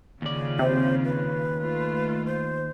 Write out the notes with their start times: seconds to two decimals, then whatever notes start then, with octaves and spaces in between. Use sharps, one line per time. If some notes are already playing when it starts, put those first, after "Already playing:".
0.22 D#2 C#3 F4 D5
0.59 C3 C5
1.04 B4
1.59 A3 F4
2.26 C5